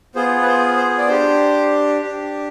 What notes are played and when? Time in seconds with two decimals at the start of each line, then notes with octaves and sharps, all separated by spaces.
0.15 B3 F4 G#4 C5
0.42 B4
0.46 C5
0.77 C5
0.98 D5
1.08 D4 G4 C5
2.01 D4 G4